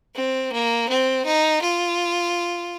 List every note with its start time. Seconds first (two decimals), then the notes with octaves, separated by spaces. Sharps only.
0.15 C4
0.53 A#3
0.90 C4
1.26 D#4
1.62 F4